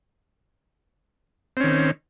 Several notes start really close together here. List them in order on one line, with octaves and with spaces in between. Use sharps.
C4 C#4 D#3